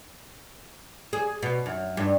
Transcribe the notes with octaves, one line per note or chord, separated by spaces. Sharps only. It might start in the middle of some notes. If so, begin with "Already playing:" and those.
G#4
B2
F#2
G2